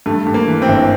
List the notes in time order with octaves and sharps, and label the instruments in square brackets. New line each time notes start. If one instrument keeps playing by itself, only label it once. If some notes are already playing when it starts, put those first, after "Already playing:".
[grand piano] G2 [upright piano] A3
[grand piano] G2
[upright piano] A#3
[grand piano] E3
[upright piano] C4
[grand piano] G1